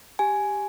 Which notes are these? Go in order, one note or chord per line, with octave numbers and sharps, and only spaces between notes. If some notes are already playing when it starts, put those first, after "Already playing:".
G4 G#5